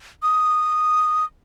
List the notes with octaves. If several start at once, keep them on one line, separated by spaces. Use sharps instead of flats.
D#6